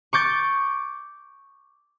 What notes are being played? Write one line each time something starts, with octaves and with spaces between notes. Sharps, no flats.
C#6 D6 G6 A6